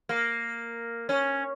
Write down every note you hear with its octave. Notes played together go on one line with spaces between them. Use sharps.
A#3
C#4